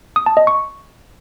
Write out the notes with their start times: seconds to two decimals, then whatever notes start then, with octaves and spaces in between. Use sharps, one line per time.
0.16 D#6
0.26 A5
0.37 D#5
0.47 C#6